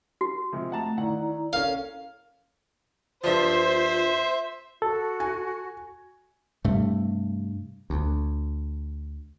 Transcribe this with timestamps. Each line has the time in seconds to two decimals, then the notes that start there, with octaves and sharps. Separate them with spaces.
0.21 F#4
0.53 C3 F3 G#3
0.72 A3 F#5 A5 A#5
0.97 D#2 E4 D5 F#5 A#5
1.53 C#4 A4 A#4 F5
3.24 G2 F3 F4 C5 E5
4.82 F#4 A4
5.20 G#5
6.64 G2 C3 A3
7.90 D2